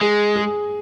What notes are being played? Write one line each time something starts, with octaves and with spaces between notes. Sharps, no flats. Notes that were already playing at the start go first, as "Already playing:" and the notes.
G#3 G#4
G#4